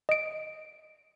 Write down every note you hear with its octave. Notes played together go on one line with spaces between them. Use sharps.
D#5 D7